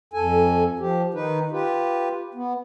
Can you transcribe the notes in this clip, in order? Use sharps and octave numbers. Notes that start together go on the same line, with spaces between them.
F2 A4 G#5
F3 G4
D#3 D#4 B4
F4 G4 B4
B3